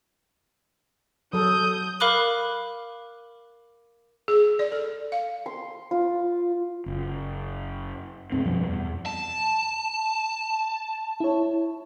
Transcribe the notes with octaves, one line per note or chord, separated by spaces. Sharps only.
F#3 A4 D#6 G6
A#4 F5 B5 D6 F#6 G7
G#4
D5
A4
F5
C6
F4
F#1
C#2 G#2 C4
F#2 B2 F3 G3
E2
A5
E4 C#5